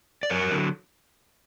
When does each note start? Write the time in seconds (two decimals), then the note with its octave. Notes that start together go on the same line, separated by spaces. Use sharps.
0.23 D5
0.30 F#2 A#4 C#5
0.51 D3 F#3